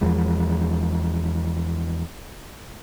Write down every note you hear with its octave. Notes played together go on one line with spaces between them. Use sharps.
E2 F3 G#3